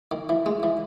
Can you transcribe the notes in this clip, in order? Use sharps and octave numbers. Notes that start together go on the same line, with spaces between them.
D#3
E3
G#3
E3